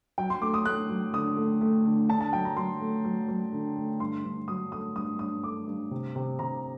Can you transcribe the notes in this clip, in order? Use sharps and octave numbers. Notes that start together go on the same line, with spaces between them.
F#3 G5
C6
A3 D6
D#6
A3 F#6
F#3
D3 D#6
A3
A3
D3
D3 A5
A5
F#3 G5
A#5
F#3 C6
A3
F#3
F#3
D3
A3
G2 C6
G2
F#3 D#6
A3 D#6
G2 D#6
G2 D#6
A3 D6
G2
C3
C3
C3 A#5